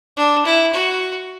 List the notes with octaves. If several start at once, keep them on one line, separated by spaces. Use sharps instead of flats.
D4
E4
F#4